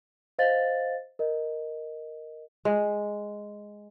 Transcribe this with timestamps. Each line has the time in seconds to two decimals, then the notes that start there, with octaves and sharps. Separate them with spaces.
0.39 C5 D#5 F5 A6
1.19 A#4 D#5
2.65 G#3